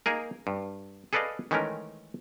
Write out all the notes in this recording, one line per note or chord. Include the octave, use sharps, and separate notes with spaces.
A#3 D#4 G#4 A#4
G2
G#4 A4 B4 D5 D#5 F5
D#3 E3 G#3 A3 C#4 A#4